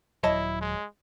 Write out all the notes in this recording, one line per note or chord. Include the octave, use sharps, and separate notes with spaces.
D#1 F#3 E4 C#5 D#5 A5
G#3